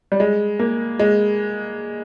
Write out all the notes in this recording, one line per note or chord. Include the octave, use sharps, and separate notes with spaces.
G3
G#3
A#3
G#3